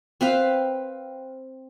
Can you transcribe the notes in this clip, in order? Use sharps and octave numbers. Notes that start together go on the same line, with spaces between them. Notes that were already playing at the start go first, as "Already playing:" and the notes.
C4 B4 F5